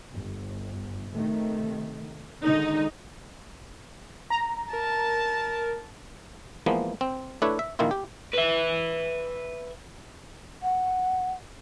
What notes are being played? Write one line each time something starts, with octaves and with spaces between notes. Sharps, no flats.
G1
C3 D#3 A3
D3 D#3 G#3 D#4
A#5
A#4 A5
E3 F3 G#3 A#3 B3
C4
A3 D4 E4 B4 C#5
E5
A#1 D#3 A#3 E4 F4
G4
B4 E5
F#5